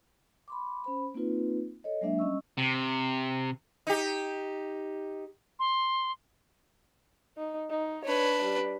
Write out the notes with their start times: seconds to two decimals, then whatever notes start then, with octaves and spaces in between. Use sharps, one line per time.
0.48 B5 C6 D6
0.84 C#4 C5 B5
1.14 A#3 C4 D#4 F4 B4
1.84 A4 C#5 D#5
2.01 F#3 G#3 A#3 D4 E5
2.19 G3 C#4 D#5 C#6 E6
2.58 C3
3.87 D#4 G4
5.59 C6
7.37 D#4
7.70 D#4
8.05 D4 B4 C#5
8.43 G3